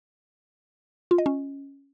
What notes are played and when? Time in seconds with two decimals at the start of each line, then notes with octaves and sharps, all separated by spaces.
1.11 F4
1.18 D#5
1.26 C#4